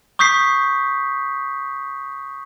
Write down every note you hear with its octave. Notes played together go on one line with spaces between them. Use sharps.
C#6 D#6 G6 B6 C7